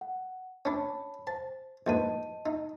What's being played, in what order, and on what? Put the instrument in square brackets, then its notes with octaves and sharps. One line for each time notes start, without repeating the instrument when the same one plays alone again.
[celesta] F#5
[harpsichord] C#4 D4 [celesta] C#5 A5 B5
[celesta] C5 [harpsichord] A5
[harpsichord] A#1 G#2 B4 [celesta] D#5 A5 D#7
[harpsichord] D#4